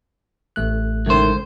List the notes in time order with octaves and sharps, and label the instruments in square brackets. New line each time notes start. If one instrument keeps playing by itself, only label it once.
[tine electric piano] A1 A3 F#6
[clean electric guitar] C#2 C5 [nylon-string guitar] A2 D#3 C#4